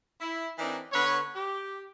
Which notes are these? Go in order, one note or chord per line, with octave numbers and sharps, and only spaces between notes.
E4
E3 C4 D4 D#4 A#4
D3 B3 B4 C#5
G4